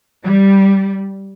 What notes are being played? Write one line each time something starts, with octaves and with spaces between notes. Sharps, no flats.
G3